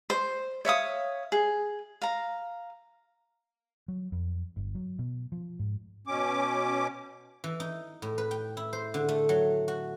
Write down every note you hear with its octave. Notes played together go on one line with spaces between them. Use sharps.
C5
C#5 E5 F5 D#6
G#4
F5 A#5
F#3
F2
G1
F#3
B2
F3
G#2
B2 C#4 D6
E3
D#4
A2
B4
G5
E4
C5
D3
A3
F#3
F#4